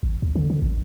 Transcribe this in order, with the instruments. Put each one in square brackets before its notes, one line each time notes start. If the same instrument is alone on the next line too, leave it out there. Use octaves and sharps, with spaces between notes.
[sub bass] A1
D#2
D3
D3
A1